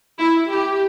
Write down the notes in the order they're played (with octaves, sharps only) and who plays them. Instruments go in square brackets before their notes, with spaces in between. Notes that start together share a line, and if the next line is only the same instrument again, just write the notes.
[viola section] E4
G4